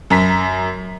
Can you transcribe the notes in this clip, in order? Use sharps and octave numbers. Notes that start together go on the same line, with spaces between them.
F#2 A#5 B6